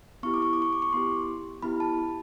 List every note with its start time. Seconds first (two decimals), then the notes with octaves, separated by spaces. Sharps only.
0.23 B3 E4 G4 C#6
0.34 D6
0.42 C#6
0.53 D6
0.62 C#6
0.73 D6
0.82 C#6
0.93 B3 E4 G4 C6
1.63 B3 E4 G4 B5
1.80 A5